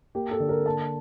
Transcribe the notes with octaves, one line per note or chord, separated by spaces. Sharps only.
A#3 G4
A4
D3
A#4
A#3 A5